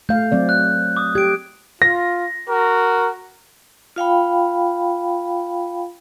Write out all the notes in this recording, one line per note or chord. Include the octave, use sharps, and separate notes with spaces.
A3 F5 G6
F#3 C4 D5
F#6
D6 D#6
G4 G#6 D7
F4 A#6
F#4 A#4
F4 F5 G5 B5